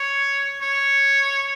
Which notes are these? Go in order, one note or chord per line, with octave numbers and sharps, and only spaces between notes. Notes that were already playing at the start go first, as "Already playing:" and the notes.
Already playing: C#5
C#5